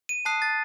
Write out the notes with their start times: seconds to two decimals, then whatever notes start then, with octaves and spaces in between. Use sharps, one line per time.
0.09 D#7
0.25 A5 D#6 F#6 C7
0.42 A6